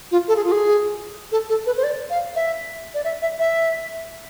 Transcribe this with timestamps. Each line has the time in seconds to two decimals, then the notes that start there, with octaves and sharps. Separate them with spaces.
0.11 F4
0.28 A4
0.36 G#4
0.44 F4
0.52 G#4
1.32 A4
1.49 A4
1.66 B4
1.77 C5
1.83 D5
2.10 F5
2.35 E5
2.94 D5
3.04 E5
3.22 E5
3.39 E5